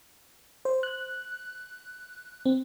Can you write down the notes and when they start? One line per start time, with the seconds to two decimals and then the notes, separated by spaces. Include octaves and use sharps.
0.65 C5
0.83 F#6
2.46 C4